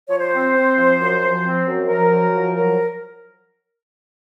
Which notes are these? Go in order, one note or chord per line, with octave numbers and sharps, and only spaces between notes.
F3 C#5
C5
C4
C4
F3
F#2
F3
C4
F#2
F3 A#4
F#2
F3
F#3 A#4